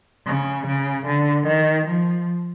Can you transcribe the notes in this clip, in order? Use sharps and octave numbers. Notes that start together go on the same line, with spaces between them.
C#3
C#3
D3
D#3
F3